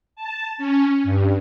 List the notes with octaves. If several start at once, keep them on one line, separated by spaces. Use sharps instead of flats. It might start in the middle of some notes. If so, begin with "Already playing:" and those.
A5
C#4
G2